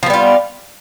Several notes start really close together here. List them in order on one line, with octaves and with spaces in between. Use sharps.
F3 B3 G3 F4